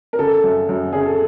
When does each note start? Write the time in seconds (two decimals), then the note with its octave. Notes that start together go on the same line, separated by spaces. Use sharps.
0.13 A#4
0.19 C#3 A4
0.44 F#2
0.69 F#2
0.92 C#3 G#4
1.06 A4